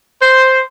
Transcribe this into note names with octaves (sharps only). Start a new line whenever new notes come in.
C5